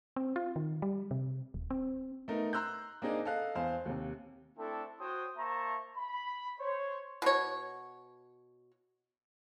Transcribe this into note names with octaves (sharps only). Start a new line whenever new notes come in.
C4
F4
D#3
G3
C3
D#1
C4
A3 B3 D#4 A#4
A#5 C6 E6 F#6 G6
A#3 C4 D4 D#4 G#4 D#5
A4 D#5 F5 F#6
E2 C5 F5
D#2 C3
A3 C4 D4 E4 A4
F#4 C5 C#5 G5 D#6
A#3 C5 E5 A5 A#5 C#6
B5
C5 C#5
B2 C#5